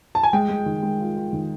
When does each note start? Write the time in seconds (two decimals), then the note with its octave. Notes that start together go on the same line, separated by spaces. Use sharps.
0.15 A5
0.23 G#5
0.33 G#3 G5
0.49 G#3
0.66 D#3
0.83 G#3
1.00 F4
1.17 F4
1.33 D#3